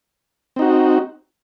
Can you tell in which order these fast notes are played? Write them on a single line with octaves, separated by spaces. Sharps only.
C4 D#4 F#4